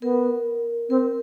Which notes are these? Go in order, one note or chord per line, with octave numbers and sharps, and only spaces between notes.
B3 A#4
C4 A#4